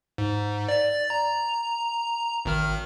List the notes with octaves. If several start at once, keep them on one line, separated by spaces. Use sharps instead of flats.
G#2
D5 A6
A#5
G#1 D#3 F6